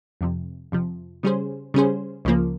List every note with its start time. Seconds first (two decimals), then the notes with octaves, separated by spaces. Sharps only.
0.21 F2 C3 F3
0.72 F2 C3 F3
1.23 C#3 G3 C#4 G#4 C5
1.74 C#3 G3 C#4 G#4 C5
2.25 C#2 C#3 F3 A#3